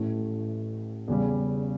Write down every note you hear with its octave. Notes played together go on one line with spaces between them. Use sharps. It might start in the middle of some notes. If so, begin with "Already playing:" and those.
Already playing: A1 A2 E3 A3
E2 C#3 G3